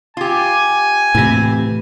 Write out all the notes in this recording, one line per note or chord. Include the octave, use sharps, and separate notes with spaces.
F4 G4 G#5
A2 C3 E3 C4